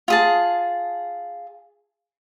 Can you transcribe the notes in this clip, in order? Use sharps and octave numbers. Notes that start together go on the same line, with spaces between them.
F4 G#4 A5